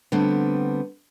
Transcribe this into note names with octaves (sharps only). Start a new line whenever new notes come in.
D3 G3 A3 B3 C4